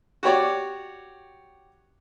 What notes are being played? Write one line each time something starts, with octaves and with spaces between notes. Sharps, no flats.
F#4 G4 C#5 D5